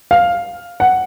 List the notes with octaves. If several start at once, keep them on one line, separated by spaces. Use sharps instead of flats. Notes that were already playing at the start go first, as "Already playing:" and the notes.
F5
F#5